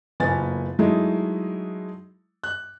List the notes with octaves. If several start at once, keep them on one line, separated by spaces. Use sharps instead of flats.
F#1 A#2 B3 G#5 A6
F#3 G#3 A3 D#4 E4
F#6